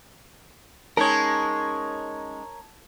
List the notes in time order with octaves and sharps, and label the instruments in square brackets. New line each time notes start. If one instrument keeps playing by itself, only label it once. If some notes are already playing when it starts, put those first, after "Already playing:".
[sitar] G#3 C#4 D#4 [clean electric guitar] A#4 C#5 [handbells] A5 G#6